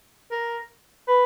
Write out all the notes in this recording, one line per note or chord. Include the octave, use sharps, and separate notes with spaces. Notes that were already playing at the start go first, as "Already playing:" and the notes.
A#4
B4